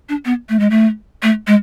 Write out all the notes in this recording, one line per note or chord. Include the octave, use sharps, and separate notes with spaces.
D4
B3
A3
G#3
A3
A3
G#3